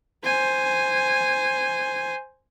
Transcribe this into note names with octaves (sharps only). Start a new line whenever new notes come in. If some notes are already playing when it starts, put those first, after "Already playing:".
C5 G#5